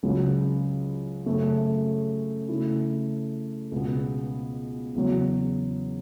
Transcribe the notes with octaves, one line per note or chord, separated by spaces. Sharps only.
C#2 C#3 F#3
F#2 C#3 A3
C#3 A3 E4
C#2 B2 B3
E2 C#3 F#3